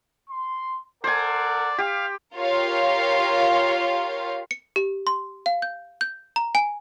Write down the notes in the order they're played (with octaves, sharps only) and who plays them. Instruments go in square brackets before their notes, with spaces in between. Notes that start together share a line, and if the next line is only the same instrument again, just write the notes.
[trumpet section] C6
[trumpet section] A4 A#4 F#5 [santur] C5 G#5 [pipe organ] D5
[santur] G4 [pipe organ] F5
[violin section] F4 G4 A#4 C#5 F5
[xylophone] C#7
G4
C6
F5
G6
G6
A#5
G#5